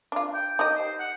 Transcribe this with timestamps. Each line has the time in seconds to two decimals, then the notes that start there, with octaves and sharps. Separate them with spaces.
0.12 D4 F4
0.35 G5
0.59 D#4 G4 D#5
0.76 C5
0.99 F#5